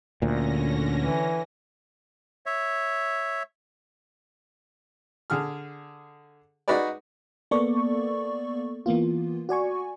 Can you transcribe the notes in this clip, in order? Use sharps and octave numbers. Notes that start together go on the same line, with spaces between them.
D2 A#2 D3 C#4 A#6
E3
C#5 E5
D3 G#4 F6
D#4 F#4 G#4 B4 D5
A#3 B3 A4 D5 C#6
E3 A#3 B3 F4
F#4 D5 G#5 C#6